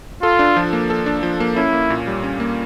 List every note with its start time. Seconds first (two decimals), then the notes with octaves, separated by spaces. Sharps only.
0.22 F4 A4
0.39 D4
0.56 F3
0.73 A#3
0.90 A4
1.06 D4
1.23 F3
1.40 A#3
1.56 C#4 E4
1.73 A#3
1.90 A#2
2.07 G3
2.24 C#4
2.40 A#3